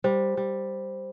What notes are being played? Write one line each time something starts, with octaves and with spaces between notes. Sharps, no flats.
G3 C5
G3